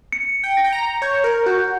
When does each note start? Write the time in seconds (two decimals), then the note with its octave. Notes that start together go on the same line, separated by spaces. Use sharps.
0.12 C#7
0.43 G5
0.57 A#6
0.64 G5
0.73 A#5
1.02 C#5 G6
1.24 A#4
1.46 F#4 G6